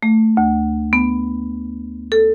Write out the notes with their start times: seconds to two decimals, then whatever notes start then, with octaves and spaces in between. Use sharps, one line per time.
0.03 A3
0.37 D2
0.93 B3
2.12 A4